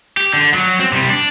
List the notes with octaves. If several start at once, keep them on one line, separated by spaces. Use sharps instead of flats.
G4
D3
F#3
C4
C3 G3
D4